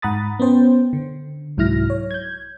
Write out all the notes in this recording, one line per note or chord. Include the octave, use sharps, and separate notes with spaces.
G#2 F#5 A#5 B5 D#6 A6
B3 C#4 C5 G5
D3
C2 G#2 F#3 E4 F6 A#6
C#5
G6 G#6